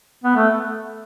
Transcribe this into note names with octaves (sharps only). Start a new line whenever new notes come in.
B3
A3